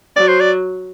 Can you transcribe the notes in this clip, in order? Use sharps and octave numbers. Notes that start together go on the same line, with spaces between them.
F#3 D5
C5
D5